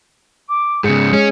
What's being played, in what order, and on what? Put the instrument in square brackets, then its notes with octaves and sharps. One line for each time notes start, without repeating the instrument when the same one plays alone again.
[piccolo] D6
[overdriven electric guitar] G#2 C#3 [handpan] G#4 [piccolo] C#7
[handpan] G#3 [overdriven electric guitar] C#4